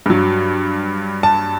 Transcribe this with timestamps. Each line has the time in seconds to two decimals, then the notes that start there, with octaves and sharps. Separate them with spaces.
0.06 G2 F#3
1.23 A5